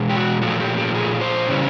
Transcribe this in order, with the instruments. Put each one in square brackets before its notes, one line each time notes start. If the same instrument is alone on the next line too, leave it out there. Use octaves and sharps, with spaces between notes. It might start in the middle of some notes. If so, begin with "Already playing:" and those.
Already playing: [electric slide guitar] E2 B2 G#3
G4
F#4
A#2 F3 A3 F#4
G4
G4
G#4
C5
C#3 E3 G3